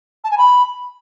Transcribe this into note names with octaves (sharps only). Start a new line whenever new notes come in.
A5
G#5
B5